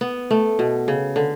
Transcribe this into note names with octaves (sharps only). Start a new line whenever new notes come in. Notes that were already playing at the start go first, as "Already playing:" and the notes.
B3
A3
B2
C#3
D3